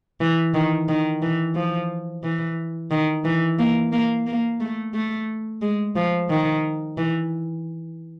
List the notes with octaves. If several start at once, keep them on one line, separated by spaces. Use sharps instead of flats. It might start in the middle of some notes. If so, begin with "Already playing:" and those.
E3
D#3
D#3
E3
F3
E3
D#3
E3
A#3
A#3
A#3
A3
A3
G#3
F3
D#3
E3